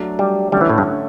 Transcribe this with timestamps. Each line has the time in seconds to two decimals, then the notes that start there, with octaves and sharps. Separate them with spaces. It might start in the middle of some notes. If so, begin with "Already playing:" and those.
Already playing: F#3 A3 D4
0.19 G3
0.52 D3 G3 A3 C#4
0.61 E3
0.69 A2
0.78 G2